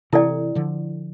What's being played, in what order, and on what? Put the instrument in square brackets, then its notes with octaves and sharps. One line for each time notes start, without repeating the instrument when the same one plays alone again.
[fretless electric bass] C3 E3 [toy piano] E4 A4 D5 G5
[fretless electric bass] D3 F3